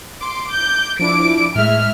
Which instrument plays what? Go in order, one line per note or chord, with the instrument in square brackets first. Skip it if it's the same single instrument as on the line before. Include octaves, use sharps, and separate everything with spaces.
[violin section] C6 [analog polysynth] D6 D7
[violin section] G6
[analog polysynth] F3 D4 E4 [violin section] D6 D7
[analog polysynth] A2 G#3 [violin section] E5 F6